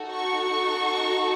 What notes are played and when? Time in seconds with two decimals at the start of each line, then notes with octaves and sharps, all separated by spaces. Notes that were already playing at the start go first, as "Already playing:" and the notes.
Already playing: D#4 F#4 A4
0.10 C#6